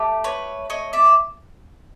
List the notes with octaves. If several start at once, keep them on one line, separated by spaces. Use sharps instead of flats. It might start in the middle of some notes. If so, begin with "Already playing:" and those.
Already playing: A3 G4
B4 C#5
C#5 D#5
D5 E5